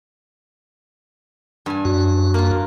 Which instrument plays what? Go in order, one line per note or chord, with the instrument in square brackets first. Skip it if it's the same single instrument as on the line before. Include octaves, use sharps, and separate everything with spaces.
[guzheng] G2 G#5
[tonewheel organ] F#2 F#4
[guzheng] A#3 F4